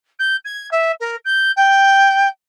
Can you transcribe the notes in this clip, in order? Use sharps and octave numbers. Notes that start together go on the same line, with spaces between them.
G6
G#6
E5
A#4
G6
G5